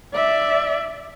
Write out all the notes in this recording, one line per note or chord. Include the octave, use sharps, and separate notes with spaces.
D5 E5